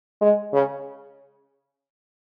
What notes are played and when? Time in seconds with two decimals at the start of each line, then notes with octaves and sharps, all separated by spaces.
0.21 G#3
0.53 C#3